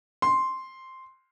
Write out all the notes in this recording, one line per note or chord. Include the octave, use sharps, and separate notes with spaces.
C6